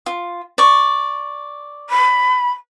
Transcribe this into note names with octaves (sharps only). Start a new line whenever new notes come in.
F4
D5 C#6
B5